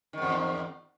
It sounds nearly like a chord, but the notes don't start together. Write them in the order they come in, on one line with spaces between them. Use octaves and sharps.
D#3 G#2 E2